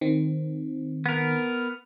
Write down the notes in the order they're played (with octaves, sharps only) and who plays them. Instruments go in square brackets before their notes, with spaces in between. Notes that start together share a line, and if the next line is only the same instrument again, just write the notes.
[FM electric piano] D#3 C4
[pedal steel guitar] B3 A#4